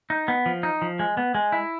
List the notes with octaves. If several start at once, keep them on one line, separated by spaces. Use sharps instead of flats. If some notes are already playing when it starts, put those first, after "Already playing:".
D#4
B3
F3
D#4
F3
G#3
B3
G#3
E4